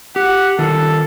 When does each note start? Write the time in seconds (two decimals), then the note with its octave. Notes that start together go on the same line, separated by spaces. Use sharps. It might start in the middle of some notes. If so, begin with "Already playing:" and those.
0.16 G4 F#5
0.59 D#3 F4 A4